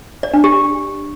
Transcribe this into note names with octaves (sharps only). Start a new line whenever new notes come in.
D5
D4
G4